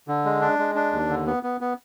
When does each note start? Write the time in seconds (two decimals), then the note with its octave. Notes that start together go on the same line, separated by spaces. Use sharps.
0.08 D3
0.25 G#3
0.41 D4
0.59 G#3
0.75 D4
0.93 D#2
1.09 D3
1.27 B3
1.43 B3
1.61 B3